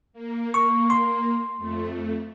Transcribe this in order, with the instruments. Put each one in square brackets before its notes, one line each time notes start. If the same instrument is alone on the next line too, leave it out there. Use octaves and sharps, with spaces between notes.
[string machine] A#3
[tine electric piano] C#6
C6
[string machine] F2 A3